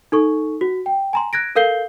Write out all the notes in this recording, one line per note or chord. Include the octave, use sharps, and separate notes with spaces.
D#4 A4 C#6
F#4
G5
G#5 A#5 C6
F#6 G#6 A#6 D7
A4 A#4 F5 G6 C7 G7